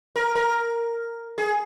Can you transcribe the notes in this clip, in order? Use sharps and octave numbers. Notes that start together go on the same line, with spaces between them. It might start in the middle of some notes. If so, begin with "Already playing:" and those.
A#4
A#4
G#4